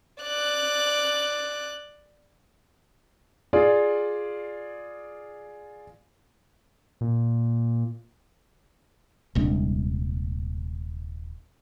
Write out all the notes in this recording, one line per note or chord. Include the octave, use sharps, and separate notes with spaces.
D5 F#6
F4 G#4 D5 F5
A#2
D#1 C2 G#3 D4